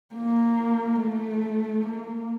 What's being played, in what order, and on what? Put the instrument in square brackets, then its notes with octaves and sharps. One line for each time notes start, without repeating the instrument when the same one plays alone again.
[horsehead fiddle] A#3
A3
A#3